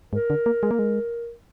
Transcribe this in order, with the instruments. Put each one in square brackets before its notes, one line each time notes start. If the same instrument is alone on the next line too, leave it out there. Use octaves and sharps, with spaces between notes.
[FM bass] G#2 [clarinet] A#4
[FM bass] D3
A#3
G#3
A#3
G#3